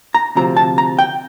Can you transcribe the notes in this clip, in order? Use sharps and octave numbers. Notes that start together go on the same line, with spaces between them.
A#5
D2 C3 F3 C4 A#5
A5
A#5
G5